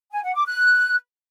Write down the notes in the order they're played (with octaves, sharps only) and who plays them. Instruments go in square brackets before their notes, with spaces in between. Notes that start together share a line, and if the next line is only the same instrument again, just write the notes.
[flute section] G#5
F#5
D6
F#6